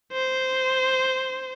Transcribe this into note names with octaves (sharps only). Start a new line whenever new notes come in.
C5